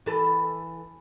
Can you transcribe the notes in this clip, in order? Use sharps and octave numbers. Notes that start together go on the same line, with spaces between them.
E3 A4 B4